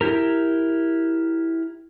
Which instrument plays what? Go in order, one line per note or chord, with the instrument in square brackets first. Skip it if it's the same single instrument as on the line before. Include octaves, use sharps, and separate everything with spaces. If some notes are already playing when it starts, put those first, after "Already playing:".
[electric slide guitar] E4 G4 A#4